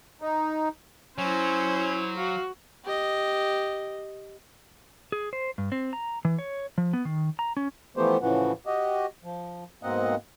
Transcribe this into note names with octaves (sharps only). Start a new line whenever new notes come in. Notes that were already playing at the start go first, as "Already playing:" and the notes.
D#4
F#3 C#4 E4 C5
F#4 F5
G4 D#5
G#4
C5
G2
C4
A#5
E3
C#5
F3
B3
D#3
A#5
C#4
E3 F3 A3 B3 G4 C5
A2 C#3 E3 F3 F#4
F#4 G4 D#5
F3
G#2 B2 A#3 C4 D#5 F#5